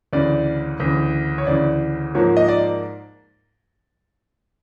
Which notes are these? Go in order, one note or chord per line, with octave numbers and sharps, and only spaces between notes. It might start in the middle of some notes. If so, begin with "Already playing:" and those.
D2 C#3 E3 D5
D2 C#3 E3
C#5
D2 C#3 E3 D5
G#2 F3 A#3 C#5
D#5
D5